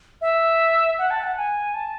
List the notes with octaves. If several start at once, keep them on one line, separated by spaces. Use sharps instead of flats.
E5
F#5
A5
F#5
G#5
A5